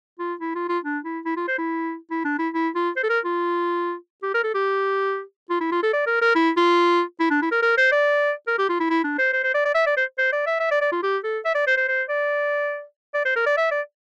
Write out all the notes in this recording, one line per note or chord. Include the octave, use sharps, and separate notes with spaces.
F4
E4
F4
F4
D4
E4
E4
F4
C5
E4
E4
D4
E4
E4
F4
C5
A4
A#4
F4
G4
A#4
A4
G4
F4
E4
F4
A4
D5
A#4
A#4
E4
F4
E4
D4
E4
A#4
A#4
C5
D5
A#4
G4
F4
E4
E4
D4
C5
C5
C5
D5
D5
E5
D5
C5
C5
D5
E5
E5
D5
D5
F4
G4
A4
E5
D5
C5
C5
C5
D5
D5
C5
A#4
D5
E5
D5